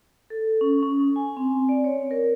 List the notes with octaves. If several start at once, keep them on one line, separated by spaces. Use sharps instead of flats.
A4
C#4
C#4
G#5
C4
D5
C#5
A#4